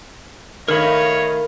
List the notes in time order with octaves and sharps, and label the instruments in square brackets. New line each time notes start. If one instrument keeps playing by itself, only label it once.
[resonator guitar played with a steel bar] D#3 A3 [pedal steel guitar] A#4 B5 [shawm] C#5 [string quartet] D#5 F5